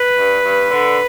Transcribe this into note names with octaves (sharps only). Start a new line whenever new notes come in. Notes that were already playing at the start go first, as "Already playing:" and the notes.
Already playing: B4
G2
G2
D3